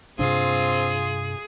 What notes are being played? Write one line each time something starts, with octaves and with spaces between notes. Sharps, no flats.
G2 C3 C4 D4 F4 G#4